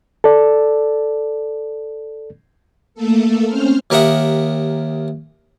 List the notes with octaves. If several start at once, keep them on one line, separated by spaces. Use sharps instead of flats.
A4 D5
A3 A#3 A4
C4 C#4 C5 F6
D#2 G4 A#4 E5 F#5 D#6